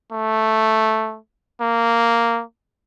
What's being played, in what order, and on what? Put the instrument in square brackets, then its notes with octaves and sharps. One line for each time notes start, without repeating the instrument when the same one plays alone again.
[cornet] A3
A#3